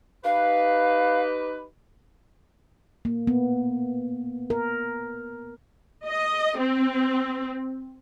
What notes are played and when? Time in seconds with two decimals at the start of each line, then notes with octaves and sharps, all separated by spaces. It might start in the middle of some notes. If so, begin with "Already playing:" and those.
0.24 D#4 G4 B4 F5
3.05 A#3
3.27 B3
4.50 A#4
6.07 D#5
6.60 C4